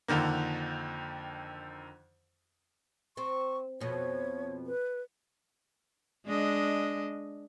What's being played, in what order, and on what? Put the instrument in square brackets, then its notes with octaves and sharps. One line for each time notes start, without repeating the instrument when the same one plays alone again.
[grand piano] F2 D3 D#3 A#3
[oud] C4 [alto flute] C#6
[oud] F2 B2 F3 [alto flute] C#5
[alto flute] B4
[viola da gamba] G#3 D4 D#5